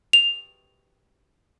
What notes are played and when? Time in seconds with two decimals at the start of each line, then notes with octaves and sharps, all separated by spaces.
0.13 F7